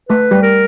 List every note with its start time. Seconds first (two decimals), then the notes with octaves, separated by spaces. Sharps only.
0.09 A3 A4 B4
0.31 G3 G4
0.42 A#4